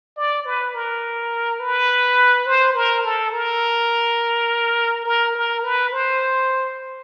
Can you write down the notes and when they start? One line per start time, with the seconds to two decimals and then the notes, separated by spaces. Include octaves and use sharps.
0.17 D5
0.45 B4
0.74 A#4
1.60 B4
2.46 C5
2.75 A#4
3.04 A4
3.33 A#4
5.05 A#4
5.35 A#4
5.63 B4
5.92 C5